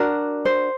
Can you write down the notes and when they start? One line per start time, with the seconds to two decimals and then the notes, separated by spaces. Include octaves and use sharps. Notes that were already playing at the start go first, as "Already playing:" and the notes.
Already playing: D4 F#4 A#4
0.45 C5